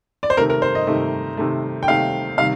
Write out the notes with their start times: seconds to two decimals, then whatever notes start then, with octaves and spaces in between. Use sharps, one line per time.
0.23 D5
0.30 C5
0.37 C3 D#3 A3 A#4
0.50 A#4
0.62 C5
0.75 D#5
0.87 C3 D#3 A3
1.37 C3 D#3 A3
1.83 G5
1.88 C3 D#3 A3 F5
2.38 C3 D#3 G3 F5